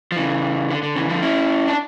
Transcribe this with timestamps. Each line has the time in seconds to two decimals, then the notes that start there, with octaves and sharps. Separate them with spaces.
0.12 F3
0.17 C#3 E3
0.70 D3
0.83 D3
0.96 C#3 E3
1.09 D3 F3
1.22 C#4 E4
1.67 D4